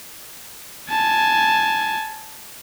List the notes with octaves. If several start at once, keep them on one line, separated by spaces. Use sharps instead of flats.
G#5 A5